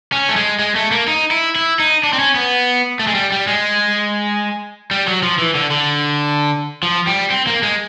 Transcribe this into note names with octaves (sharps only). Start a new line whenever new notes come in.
C#4
A3
G#3
G#3
A3
A#3
D#4
E4
E4
D#4
D4
C4
C#4
B3
A3
G#3
G3
G3
G#3
G3
F#3
F3
E3
D3
D3
F3
G3
C4
A#3
G#3